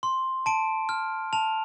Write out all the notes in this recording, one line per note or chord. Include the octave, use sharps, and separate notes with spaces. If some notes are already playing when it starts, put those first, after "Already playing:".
C6
A5 D7
F6
A5 F7